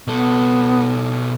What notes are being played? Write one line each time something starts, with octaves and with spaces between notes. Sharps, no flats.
B2 B3 A4